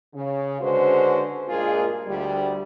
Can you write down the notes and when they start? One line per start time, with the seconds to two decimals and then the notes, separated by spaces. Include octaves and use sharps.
0.14 C#3
0.61 D3 G#3 C#4 F#4 B4 C5
1.48 G2 A#2 G#3 A#3 F4 G#4
2.07 D2 G3